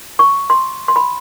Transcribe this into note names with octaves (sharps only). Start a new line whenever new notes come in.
C#6
C6
C6
B5